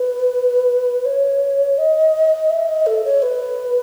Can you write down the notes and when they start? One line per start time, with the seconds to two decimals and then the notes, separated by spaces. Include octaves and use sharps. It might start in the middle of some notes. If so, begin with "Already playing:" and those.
Already playing: B4
1.05 C#5
1.78 D#5
2.50 E5
2.69 D#5
2.87 A4
3.05 C#5
3.22 B4